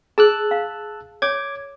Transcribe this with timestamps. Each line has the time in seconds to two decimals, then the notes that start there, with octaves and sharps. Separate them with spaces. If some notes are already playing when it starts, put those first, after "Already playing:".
0.18 G#4 A5 E6 F#6
0.51 F5
1.22 C#5 D6 G#6